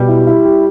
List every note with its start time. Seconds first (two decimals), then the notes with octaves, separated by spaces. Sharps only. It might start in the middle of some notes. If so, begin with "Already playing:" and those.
Already playing: B2 G3
0.08 E4
0.27 E4
0.45 G4